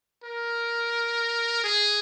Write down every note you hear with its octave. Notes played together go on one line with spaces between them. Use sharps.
A#4
G#4